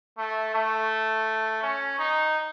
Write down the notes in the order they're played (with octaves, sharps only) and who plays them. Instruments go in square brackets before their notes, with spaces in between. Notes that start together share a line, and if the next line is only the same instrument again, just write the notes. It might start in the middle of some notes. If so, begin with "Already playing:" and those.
[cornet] A3
A3
C#4
D#4